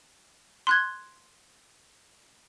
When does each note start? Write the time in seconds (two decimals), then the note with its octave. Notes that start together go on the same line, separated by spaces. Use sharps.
0.67 C6 F#6 G#6